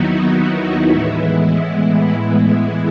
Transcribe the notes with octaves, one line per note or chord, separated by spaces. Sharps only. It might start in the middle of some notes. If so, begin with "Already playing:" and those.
Already playing: D#2 D#3 F#3 B3 D#4 E4 F#4
A2 E3 G#3 B3 E4